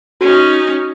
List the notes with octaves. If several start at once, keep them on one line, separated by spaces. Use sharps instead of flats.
C#4 D#4 F#4